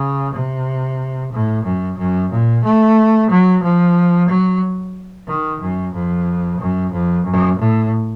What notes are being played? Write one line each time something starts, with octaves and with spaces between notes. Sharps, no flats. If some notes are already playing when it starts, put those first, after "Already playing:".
Already playing: C#3
C3
A2
F#2
F#2
A#2
A3
F#3
F3
F#3
D#3
F#2
F2
F#2
F2
F#2
A2